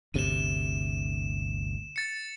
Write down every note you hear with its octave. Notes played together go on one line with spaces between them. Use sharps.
G1 D2 C3 D#7 E7
A6 C#7